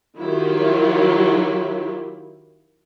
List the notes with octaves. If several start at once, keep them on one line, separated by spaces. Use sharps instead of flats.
D#3 F#3 E4 F4 G4